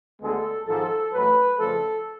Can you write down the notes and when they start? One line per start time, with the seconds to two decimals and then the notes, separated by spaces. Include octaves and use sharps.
0.21 D2 D3 G#3 B3 A4
0.66 G#1 G#2 F3 A4
1.13 A1 A2 F#3 B4
1.58 F2 C#3 F3 A3 A4